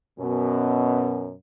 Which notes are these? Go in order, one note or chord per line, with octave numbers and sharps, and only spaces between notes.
F#2 B2